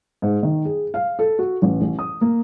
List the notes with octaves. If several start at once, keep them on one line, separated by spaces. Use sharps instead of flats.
G#2
D#3
G#4
F5
A4
F#4
A1
A1
D#6
A#3